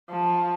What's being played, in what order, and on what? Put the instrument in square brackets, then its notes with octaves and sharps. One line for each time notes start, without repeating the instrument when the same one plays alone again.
[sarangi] F3